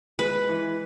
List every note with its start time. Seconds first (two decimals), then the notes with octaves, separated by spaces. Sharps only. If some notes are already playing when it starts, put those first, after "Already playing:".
0.19 G#3 B4
0.49 E3